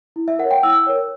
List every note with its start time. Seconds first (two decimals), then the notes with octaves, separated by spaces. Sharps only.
0.16 E4
0.28 E5
0.39 A#4 C#5 F#5
0.51 G5
0.63 E4 E6
0.87 A#4 C#5